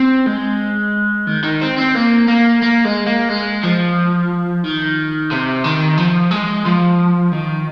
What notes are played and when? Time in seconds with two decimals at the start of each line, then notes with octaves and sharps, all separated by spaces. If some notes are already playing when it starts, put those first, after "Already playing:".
Already playing: C4
0.27 G#3
1.27 D#3
1.44 D#3
1.61 C4
1.78 C4
1.95 A#3
2.28 A#3
2.62 A#3
2.85 G#3
3.06 A#3
3.29 G#3
3.63 F3
4.64 D#3
5.31 C3
5.64 D#3
5.98 F3
6.31 G#3
6.66 F3
7.33 D#3